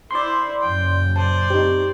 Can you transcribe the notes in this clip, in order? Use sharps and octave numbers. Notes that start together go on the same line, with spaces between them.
E4 C5 D5 C6
F#2 A#2 C#3 G5
C5 D5 A5
C4 D#4 G4